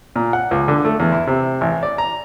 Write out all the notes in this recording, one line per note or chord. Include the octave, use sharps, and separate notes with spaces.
A#2
F#5
C#2
D3
A3
E2
E4
C3
A1
D5
A#5